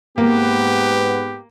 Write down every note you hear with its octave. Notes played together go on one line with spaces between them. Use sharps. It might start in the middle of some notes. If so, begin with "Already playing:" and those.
G#2 A#3 B3 G4 B4